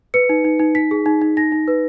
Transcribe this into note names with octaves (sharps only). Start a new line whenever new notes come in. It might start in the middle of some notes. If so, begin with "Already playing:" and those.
B4 C#7
D#4
D#4
D#4
D#4 B6
G#4
D#4
D#4
D#4 A#6
D#4
B4